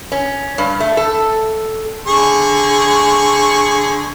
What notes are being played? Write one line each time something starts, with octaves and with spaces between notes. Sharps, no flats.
C#4
G2
A3
A4
D3 G#4 C#6